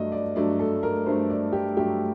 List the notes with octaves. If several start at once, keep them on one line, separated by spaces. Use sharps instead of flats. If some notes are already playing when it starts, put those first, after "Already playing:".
Already playing: G2 F#3 A3 D5 D#5
D5
G2 F#3 A3 D5
A4
A#4
G2 F#3 A3 C5
D5
G4
G2 F#3 A3 G4